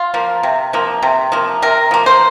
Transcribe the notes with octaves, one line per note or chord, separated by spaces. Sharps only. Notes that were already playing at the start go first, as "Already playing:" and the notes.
Already playing: F4
F3 A#3
C3
F3 A#3
C3
F3 A#3
C3 A#4
F3 A#3
C5